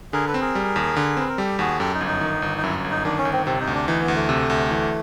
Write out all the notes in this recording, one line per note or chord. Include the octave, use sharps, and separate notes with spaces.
D3 G#4 A#4
A4 B4
C4
G#4 A#4
G3
D#2
D3
C4 B4
A#4
G3 G4 A4
D#2 F#4 G#4
F#2 G4 A4
D#4
G1
D#4
D#3
G1
D#4
F#2 E4
G1
D#4
D#3 D4
C#4
G1
C4
C3 C4
D#4
D2
D4
E3 D#4
B3
D2
A3
C3
D2
E3